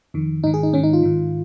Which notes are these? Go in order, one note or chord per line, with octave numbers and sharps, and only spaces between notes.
F2 D#3
G#2 D#3 D#4
G#4
D#4
G#2 D#3 C#4
D#4
F4
G#2 D#3